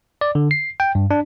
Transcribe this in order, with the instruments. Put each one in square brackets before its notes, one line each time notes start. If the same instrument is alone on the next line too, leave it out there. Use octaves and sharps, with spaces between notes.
[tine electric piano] D5
D3
C7
G5
G2
D4